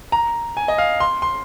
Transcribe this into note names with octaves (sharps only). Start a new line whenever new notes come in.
A#5
G#5
D#5
F5
C6
C6